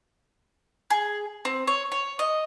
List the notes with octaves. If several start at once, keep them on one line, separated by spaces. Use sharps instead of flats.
G#4
C4
C#5
C#5
D#5